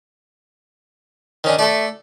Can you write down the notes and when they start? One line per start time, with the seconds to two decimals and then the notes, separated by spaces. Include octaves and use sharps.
1.44 D#3 C#4 D4
1.59 A3 A4 D5